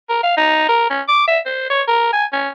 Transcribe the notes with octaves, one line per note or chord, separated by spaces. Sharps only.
A#4
F5
D#4
A#4
C#4
D6
E5
C5
C#5
A#4
G#5
C#4